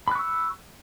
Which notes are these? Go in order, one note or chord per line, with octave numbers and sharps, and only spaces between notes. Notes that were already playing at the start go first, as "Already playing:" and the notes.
B5 C#6 E6 F#6